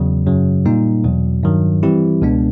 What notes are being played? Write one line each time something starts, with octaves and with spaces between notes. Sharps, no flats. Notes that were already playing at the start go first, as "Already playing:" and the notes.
Already playing: E2 C#3 F#3
F#2 C#3 F#3
A#2 G3 A#3 D#4
E2 B2 F#3
G2 D#3 F#3
E3 G3 C4 E4 G4
C#2 B2 G#3 B3 D4